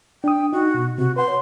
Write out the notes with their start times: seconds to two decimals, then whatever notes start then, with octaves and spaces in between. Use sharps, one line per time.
0.24 D4 G5 D#6
0.53 D#4 F#4
0.74 B2
0.98 C3 F#4
1.16 B4 F#5 C6
1.28 C#5